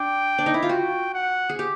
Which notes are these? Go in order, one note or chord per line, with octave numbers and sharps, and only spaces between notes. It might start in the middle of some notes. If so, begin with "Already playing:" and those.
Already playing: D4 G5
D4
D#4
E4
F4
F#4 G5
F#5
G#4
G4